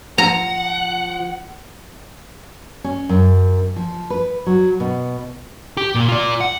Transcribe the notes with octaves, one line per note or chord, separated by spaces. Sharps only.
F3 F#5 A#5
C#4
F#2
F3
B4
F#3
B2
G4
A#2
F4 D5
F#5